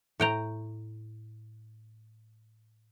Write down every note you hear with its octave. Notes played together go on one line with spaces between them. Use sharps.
A2 G5 A#5